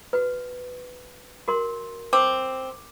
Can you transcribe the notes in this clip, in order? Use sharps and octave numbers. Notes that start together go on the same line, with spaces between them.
F#4 B4
F#4 A#4 C6
C4 D6